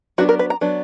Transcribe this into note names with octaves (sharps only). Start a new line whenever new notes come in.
F#3 B3 D4 F#4
A#4
B4
A#5
F#3 B3 D4